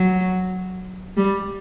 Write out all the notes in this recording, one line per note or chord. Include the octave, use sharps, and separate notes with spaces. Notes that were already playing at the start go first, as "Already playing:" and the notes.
Already playing: F#3
G3